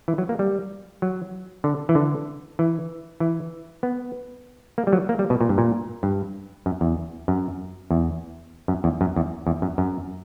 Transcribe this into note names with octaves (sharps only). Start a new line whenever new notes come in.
E3
F#3
A#3
G3
F#3
D3
E3
D3
E3
E3
B3
A#3
G3
F#3
A#3
G3
B2
A#2
G2
A#2
G2
F#2
E2
F#2
E2
F#2
E2
F#2
E2
E2
F#2
F#2